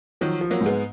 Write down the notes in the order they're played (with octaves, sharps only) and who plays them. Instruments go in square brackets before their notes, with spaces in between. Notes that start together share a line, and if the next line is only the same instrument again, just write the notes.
[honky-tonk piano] D#3 F#3 [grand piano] F3
[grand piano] F3
[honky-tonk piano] F#3 A#3
[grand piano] G#2
[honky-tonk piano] G#3 B3